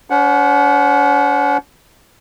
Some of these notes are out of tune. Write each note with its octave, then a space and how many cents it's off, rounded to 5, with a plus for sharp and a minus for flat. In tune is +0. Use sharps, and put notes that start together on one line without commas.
C#4 +45 C5 +0 F#5 +0